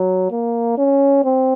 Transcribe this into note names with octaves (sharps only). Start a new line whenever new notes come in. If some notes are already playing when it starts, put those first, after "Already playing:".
Already playing: F#3
A#3
C#4
C4